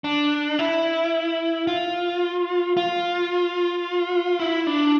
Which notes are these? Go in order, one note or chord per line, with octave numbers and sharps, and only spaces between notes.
D4
E4
F4
F4
E4
D4